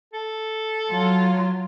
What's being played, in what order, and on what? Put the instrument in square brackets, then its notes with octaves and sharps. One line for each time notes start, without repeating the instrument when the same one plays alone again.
[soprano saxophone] A4
[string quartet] F#3 F4